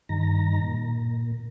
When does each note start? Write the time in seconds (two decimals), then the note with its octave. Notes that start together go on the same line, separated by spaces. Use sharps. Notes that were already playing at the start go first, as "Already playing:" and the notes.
0.09 G2 D#3 A#5
0.62 A#2